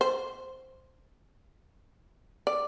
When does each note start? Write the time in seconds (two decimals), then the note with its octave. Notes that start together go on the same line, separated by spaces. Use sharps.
0.01 C5
2.47 D5